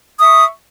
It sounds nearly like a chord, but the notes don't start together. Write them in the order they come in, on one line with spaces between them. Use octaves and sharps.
D#6 E5 C#6